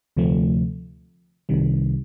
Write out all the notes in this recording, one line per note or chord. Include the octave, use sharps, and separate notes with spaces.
D2 C3 F3 A3
C2 C3 D#3 G3